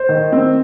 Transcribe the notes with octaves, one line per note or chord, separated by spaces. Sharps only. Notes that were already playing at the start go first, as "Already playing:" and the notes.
Already playing: C5
D#3
C4